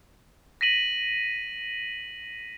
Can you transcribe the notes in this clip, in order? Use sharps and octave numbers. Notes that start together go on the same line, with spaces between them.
A#6 B6 D#7 F#7